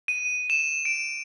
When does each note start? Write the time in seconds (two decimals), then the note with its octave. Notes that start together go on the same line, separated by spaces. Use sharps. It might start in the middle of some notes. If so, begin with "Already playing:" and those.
0.08 D#7
0.50 E7
0.85 D7